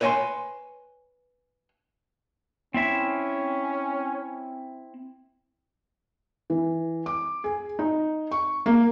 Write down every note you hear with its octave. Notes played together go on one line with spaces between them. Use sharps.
B4 C#5 D#5 G5 G#5 C6
C4 C#4 E4 E5
E3
D6
G#4
D#4
C#6
A#3